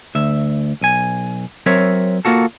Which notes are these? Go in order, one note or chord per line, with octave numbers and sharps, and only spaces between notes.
D2 E5
B1 G#5
F#3 C4 A#4 C#5 E5
A#3 B3 F4 F#4 A4